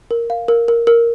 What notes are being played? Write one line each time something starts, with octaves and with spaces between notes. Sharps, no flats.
A#4
F5
A#4
A#4
A#4